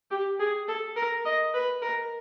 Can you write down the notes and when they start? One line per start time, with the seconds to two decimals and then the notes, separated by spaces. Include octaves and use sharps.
0.11 G4
0.40 G#4
0.68 A4
0.96 A#4
1.25 D#5
1.54 B4
1.82 A#4